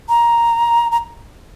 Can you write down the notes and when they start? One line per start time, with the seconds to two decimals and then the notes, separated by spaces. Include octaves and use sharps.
0.09 A#5
0.92 A#5